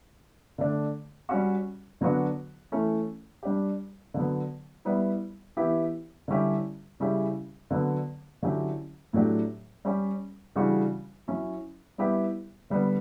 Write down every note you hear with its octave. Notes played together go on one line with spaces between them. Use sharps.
D3 A3 D4
G3 C#4 F#4
D3 F#3 B3 D4 F#4
E3 A3 C#4
G3 D4 G4
D3 F#3 B3
G3 B3 E4
E3 B3 E4 G4
D3 G3 C#4 E4 G4
C#3 G3 C#4 E4 G4
D3 F#3 B3
D3 F#3 C#4 E4 G4
A2 F#3 A3 D4 G4
G3 C#4 G4
C#3 E3 G3 D4 F#4
F#3 C#4 E4
G3 B3 E4 G4
D3 G3 B3